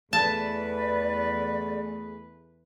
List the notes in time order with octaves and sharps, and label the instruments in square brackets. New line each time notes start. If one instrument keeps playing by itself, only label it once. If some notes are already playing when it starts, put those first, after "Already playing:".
[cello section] E2 B4 [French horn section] A3 G#4 [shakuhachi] D5 [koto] A5